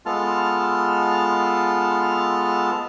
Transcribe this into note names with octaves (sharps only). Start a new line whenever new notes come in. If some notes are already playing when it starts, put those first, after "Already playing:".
G#3 B3 F4 A4 A5 F6